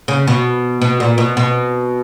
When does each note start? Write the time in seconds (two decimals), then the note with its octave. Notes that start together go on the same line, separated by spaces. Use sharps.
0.08 C#3
0.27 B2
0.82 B2
1.00 A#2
1.18 B2
1.37 B2